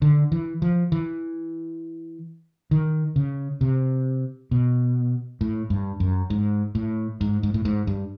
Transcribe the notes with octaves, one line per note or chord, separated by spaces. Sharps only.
D3
E3
F3
E3
D#3
C#3
C3
B2
A2
G2
F#2
G#2
A2
G#2
G#2
A2
G#2
G2